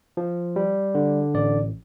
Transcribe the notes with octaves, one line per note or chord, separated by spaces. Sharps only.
F3
G3
D3
A1 D5